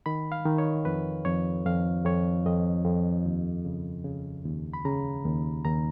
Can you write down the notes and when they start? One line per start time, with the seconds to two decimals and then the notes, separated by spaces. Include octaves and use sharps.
0.06 D#3 B5
0.32 F5
0.46 D#3
0.58 C#5
0.85 F2 B4
1.25 F2 C#5
1.66 F2 F5
2.05 F2 C#5
2.46 F2 D#5
2.85 F2
3.26 D#2
3.65 C#3
4.05 C#3
4.45 D#2
4.74 B5
4.85 C#3 A#5
5.25 D#2
5.65 D#2 A#5